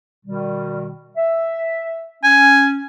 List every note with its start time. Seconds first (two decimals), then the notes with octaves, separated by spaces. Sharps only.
0.25 B2 D#3 G3
1.16 E5
2.24 C#4 G#5